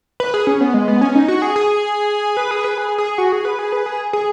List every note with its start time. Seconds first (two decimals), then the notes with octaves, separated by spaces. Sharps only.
0.20 B4
0.34 G#4
0.47 C#4
0.61 B3
0.74 G#3
0.88 B3
1.01 C#4
1.15 D#4
1.28 F#4
1.42 G#4
1.56 G#4
2.37 B4
2.51 G#4
2.64 B4
2.78 G#4
2.98 G#4
3.18 F#4
3.32 G#4
3.45 B4
3.59 G#4
3.72 B4
3.86 G#4
4.13 G#4